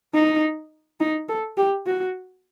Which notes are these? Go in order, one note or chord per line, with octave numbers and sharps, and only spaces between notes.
D#4
D#4
A4
G4
F#4